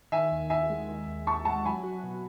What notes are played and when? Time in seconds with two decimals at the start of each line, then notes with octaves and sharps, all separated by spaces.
0.12 D#3 E5 G#5
0.32 D#2
0.50 D#2 E5 G#5
0.70 G#3
0.88 D#3
1.07 D#2
1.27 D#2 A5 C#6
1.45 G#3 F#5 A5
1.64 F#3 G#5 B5
1.84 F#4
2.03 B2